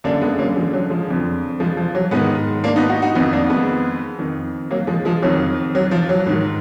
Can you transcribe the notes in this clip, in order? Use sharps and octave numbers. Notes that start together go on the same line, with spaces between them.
F#2 D3 A#3 D4
G#3 B3
F#3 A#3
F3 G#3
F#3
F3 G#3
F2 D3
F3 G#3
F3
F#3
G#2 D#3 G#3 B3
A#3 D4
B3 D#4
D#4 F#4
D#4 F#4
F2 D#3 B3 D#4
A#3 D4
G#3 B3
F2 D#3
F#3 A#3
F3 G#3
F3 G#3
F2 D#3 F#3
F#3
F3
F#3
G#2 D#3